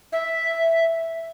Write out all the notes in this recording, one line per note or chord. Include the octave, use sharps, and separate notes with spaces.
E5